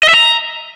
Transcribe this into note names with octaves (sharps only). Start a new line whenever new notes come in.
D#5
E5
A#5